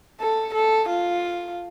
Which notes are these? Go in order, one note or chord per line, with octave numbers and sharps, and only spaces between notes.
A4
A4
F4